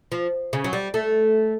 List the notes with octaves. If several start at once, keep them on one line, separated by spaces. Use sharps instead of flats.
F3
C#3
F#3
G3
A3